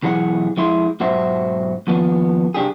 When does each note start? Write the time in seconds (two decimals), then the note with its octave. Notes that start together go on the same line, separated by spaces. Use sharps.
0.03 B1 E3 G#4 A#4 F#5
0.57 F2 G#3 E4 C6
1.00 B1 G#2 F#4 C5 E5
1.87 D#2 F3 B3
2.54 C2 D4 G4 G#4